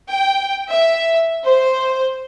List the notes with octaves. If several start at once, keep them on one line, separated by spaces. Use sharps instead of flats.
G5
E5
C5